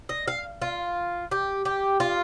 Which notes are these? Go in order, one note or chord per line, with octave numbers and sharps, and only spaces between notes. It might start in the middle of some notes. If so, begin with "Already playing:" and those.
D#5
F5
F4
G4
G4
F4